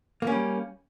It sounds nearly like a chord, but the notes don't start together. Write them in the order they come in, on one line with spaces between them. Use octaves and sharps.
A#3 C#4 G3